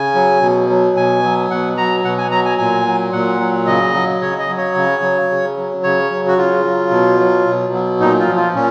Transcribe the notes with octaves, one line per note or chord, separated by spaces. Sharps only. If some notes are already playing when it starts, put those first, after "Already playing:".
Already playing: C#3 G#5
F#3
B2
F#3
B2 G#5
F#3
B2 F#5
F#3 A#5
B2 F#5
G#5
F#3 A#5
G#5
A#2 G#5
F#3
A#2 F#5
F#3
C#3 D#5
F#3
C#3 C#5
D#5
F#3
C#5
C#3
F#3
C#3
F#3
C#3 C#5
F#3
F#4
C#3 F4
F#3
B2
F#3
B2
F#3
A#2 D#4
F4
F3
F4
A#2 C#4